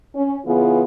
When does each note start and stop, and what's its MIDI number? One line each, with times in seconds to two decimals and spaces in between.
0.14 0.37 61
0.45 0.84 49
0.45 0.84 52
0.45 0.84 59
0.45 0.84 65
0.45 0.84 68